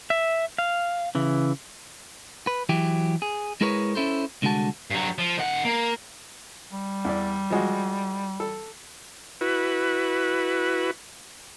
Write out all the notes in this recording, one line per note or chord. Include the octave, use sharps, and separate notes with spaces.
E5
F5
C#3 E3
B4
E3 F#3 E4 G4
G#4
G#3 E4 G#4 A#4 B4 C#5
C#4 E4 A4 C5
C2 D3 G#3 F#4 A5
G2 F#3
F3
D#3 F#5
A#3
G3
E2 D5
F3 G#3 F#4
A4
E4 F#4 B4